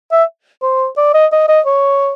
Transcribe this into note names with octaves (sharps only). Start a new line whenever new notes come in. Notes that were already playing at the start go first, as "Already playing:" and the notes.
E5
C5
D5
D#5
D#5
D#5
C#5